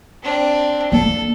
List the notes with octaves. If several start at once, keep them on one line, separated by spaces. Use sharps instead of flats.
C4 D4
A#3 A4